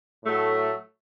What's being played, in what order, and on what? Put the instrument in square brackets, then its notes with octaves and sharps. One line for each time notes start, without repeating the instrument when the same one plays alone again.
[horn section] A2 F#3 A3